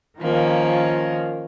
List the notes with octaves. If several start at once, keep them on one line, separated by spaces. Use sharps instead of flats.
D#3 F3 A#3 C#4